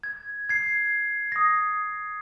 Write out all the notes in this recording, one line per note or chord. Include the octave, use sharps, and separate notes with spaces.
G#6
G#6 C7
D#6 A#6